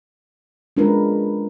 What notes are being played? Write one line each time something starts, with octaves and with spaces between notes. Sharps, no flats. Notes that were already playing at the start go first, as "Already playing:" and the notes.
G#3 C#4 D4 F4 A#4 B4